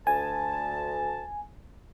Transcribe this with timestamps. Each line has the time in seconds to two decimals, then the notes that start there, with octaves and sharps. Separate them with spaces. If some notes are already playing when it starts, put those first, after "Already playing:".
0.07 D2 G#5 A5